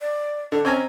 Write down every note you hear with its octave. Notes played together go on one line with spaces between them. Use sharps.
D5
D3 D4
C4 C#4 G#5 A#5